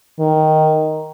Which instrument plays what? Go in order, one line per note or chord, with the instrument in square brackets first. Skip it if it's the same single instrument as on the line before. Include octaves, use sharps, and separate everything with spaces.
[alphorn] D#3